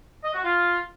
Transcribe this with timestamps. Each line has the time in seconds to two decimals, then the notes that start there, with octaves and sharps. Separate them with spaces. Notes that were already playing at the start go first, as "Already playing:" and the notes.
0.24 D#5
0.34 F#4
0.44 F4